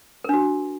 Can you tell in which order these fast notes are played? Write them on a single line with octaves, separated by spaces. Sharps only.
A#4 D4 F#4